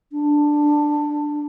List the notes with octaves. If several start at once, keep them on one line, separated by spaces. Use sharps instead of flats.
D4